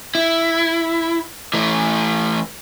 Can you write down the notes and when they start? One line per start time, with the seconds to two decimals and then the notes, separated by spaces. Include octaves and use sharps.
0.15 E4
1.54 E3 A3